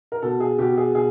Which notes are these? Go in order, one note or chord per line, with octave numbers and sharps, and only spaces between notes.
A#4
B2 A4
G#4
B2 G4
G#4
B2 G#4